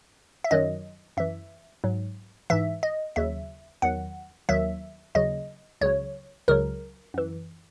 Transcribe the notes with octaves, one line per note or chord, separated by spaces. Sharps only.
E5
F#2 D#3 F#3 D#5
F#2 E3 E5
G#2 F#3
G#2 E3 E5
D#5
D#2 C#3 F#3 E5
E2 D#3 F#3 F#5
D#2 D#3 F#3 E5
D#2 C#3 F#3 D#5
C#2 C#3 F#3 C#5
C#2 C#3 F#3 A#4
F#2 E3